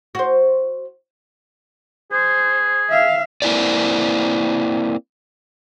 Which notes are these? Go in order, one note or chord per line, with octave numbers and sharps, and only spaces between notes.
F#4 C5
G#4 C5
E5 F5
A#3 C4 E4 A4 D5